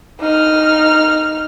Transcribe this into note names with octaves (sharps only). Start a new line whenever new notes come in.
D#4 F6